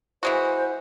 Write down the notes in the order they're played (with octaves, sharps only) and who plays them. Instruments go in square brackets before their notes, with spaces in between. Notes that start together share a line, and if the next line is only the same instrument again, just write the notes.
[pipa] E3 G#3 F#4 [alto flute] C5